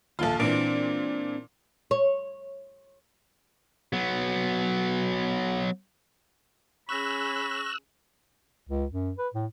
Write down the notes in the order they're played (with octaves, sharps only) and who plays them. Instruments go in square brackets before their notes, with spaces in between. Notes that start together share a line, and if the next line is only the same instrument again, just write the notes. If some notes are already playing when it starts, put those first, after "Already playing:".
[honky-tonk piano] A#1 F4 [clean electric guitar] D#2 A4
[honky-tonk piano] A#2 E3 [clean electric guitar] C4 D4
[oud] C#5
[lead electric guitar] F#3 B3
[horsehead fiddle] C#4 G#4 [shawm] B5 [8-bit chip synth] C#6 A#6 [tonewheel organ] E6 F#6
[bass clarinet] C#2
F#2
B4
A2